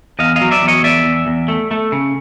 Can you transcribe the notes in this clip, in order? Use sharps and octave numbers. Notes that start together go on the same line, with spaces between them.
E2 D#5 F5
D#5 F5
F#3
D5 E5
E2
C#5 D#5
E2 D5 E5
E2
E2
A3
A3
C#3